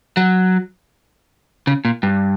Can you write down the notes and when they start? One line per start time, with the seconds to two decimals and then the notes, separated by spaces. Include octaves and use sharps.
0.17 F#3
1.67 C#3
1.85 A#2
2.03 G2